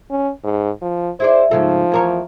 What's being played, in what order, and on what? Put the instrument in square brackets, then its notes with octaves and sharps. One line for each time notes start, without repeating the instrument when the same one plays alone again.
[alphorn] C#4
G#2
F3
[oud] E4 G#4 D5 [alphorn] C5
[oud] G#2 C#3 A4 [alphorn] F3
[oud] E2 A#4 C#5